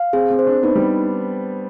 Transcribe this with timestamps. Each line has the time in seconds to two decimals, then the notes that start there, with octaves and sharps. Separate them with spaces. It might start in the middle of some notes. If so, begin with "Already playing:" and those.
Already playing: F5
0.13 C4 G#4
0.30 C4
0.39 C5
0.47 D4
0.63 B3 D#4
0.75 G3